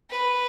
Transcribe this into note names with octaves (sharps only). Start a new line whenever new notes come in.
B4